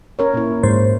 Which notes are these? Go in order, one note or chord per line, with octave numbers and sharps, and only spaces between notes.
C#4 A#4 C#5
A#2 E4
G#2 C5